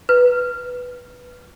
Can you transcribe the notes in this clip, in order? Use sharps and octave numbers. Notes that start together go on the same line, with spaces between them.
B4